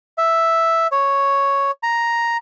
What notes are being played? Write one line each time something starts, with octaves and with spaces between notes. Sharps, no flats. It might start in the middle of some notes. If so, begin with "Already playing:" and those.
E5
C#5
A#5